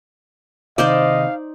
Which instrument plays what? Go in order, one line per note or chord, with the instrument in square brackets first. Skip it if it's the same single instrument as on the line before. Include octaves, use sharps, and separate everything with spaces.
[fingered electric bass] C3 D#3 [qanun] D#4 C5 D5 [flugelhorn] D#5 [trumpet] F5